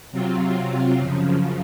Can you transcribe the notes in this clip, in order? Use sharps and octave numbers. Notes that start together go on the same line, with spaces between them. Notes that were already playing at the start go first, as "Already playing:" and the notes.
C3 F#3 C4 F4
F#2 C#3 F3